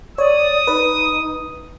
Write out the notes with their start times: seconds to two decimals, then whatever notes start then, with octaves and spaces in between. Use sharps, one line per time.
0.18 C#5 D5 D#6
0.67 D#4 B4